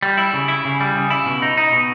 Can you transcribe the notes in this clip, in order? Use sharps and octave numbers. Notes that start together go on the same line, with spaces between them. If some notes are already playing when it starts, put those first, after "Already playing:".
G3
E4
C#3
E4
C#3
G3
C#3
E4
B2
D#4
D#4
B2